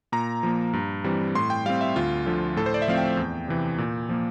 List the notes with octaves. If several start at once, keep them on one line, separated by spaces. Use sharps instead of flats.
A#2 A#5
F3 A#3
G2
E3 G3 C4
A2 C6
G5
G3 C4 F5
E5
D2 F4
D3 F3
A2 A4
C5
D5
E5
F3 A3 C4 F5
G5
E2
C3 E3
A#2
F3 A#3